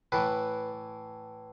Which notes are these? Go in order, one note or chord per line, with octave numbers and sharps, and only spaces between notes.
A2 E3 B4